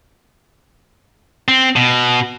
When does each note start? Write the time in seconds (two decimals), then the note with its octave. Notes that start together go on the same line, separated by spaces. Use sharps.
1.48 C4
1.76 B2